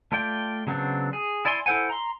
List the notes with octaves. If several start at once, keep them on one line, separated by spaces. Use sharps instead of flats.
A3 F4 D5 G5
C#3 F#3 B3 C4 D4
G#4
E4 D5 G#5 B5 C6
E4 A4 C5 F#5 G#5
A#5 C6